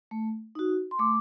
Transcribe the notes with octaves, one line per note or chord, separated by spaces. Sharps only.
A3
D#4 F#4
C6
A3 D6